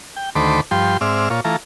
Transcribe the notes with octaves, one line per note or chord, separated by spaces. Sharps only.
G5
D2 D#3 A3 C5 B5 D6
G2 F3 G5 C6
G#2 C4 D5 E5 F6
A#2 F4 C#5
E3 A3 F4 A#5